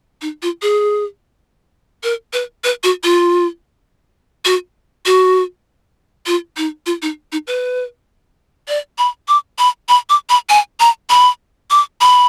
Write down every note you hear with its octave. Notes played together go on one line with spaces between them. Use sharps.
D#4
F4
G#4
A#4
B4
B4
F#4
F4
F#4
F#4
F4
D#4
F4
D#4
D#4
B4
D5
B5
D6
B5
B5
D6
B5
G#5
A#5
B5
D6
B5